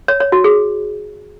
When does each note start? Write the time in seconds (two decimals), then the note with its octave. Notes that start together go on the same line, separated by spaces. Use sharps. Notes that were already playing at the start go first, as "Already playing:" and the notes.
0.08 C#5
0.20 C#5
0.32 F#4
0.44 G#4